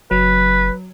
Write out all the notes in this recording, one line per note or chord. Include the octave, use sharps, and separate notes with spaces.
F#1 F#3 B4